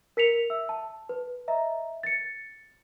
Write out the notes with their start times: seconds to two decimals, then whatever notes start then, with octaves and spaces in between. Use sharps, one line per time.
0.17 A#4 B6 C#7 F7
0.50 E5 E6
0.69 A5
1.09 B4
1.48 D#5 E5 A#5
2.03 A6 C#7